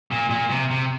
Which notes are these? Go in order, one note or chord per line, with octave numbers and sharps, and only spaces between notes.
A#2
A#2
C3
C3